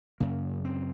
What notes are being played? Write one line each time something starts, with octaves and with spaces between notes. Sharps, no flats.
F#2 C#3 A#3
C4